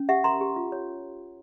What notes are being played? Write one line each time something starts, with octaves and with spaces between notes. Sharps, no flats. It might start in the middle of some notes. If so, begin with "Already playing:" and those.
Already playing: C#4
G4 E5 F#5
A#4 A#5 C6
G4
F4
C#5